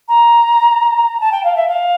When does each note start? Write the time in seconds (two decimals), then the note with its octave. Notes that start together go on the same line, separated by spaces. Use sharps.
0.08 A#5
1.20 A5
1.32 G5
1.44 F5
1.56 E5
1.68 F5